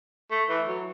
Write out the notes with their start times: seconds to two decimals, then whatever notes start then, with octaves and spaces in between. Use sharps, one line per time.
0.31 A3
0.49 E3
0.68 F#3